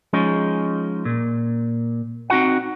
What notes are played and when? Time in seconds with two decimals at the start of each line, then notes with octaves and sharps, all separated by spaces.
0.13 F3 G#3 C#4 D#4
1.05 A#2
2.30 C4 D#4 F#4 F#5